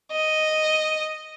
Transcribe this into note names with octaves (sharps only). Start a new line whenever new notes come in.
D#5